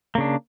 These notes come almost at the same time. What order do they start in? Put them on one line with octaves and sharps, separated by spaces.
A#3 C#3 D4